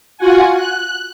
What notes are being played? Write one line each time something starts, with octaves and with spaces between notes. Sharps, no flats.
F4 F#4 F#5 G#5
F#6